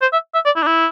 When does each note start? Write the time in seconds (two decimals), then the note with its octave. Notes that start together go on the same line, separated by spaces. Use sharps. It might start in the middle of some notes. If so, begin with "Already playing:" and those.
0.02 C5
0.13 E5
0.34 E5
0.46 D5
0.56 E4
0.62 D4
0.67 E4